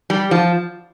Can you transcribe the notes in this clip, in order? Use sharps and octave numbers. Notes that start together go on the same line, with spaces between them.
G3
F3